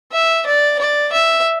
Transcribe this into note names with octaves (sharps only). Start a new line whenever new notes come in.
E5
D5
D5
E5